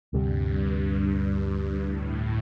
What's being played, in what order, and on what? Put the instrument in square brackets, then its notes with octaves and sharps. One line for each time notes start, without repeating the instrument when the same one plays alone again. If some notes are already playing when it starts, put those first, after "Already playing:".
[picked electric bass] D2 C3 G3 [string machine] G2
[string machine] A2